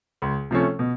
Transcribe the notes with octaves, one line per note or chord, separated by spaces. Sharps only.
C#2
C3 F3 A3 C#4
B2